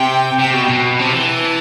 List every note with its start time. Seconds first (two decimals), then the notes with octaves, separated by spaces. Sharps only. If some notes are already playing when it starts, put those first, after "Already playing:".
Already playing: C3 G5
0.39 C3 G5
0.53 B2
0.69 B2
0.99 C3 A5
1.13 E3